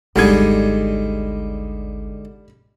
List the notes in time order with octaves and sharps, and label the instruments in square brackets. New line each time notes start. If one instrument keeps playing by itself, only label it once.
[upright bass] G#1 D2 [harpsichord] D3 G#3 D#4 [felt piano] G3 G#6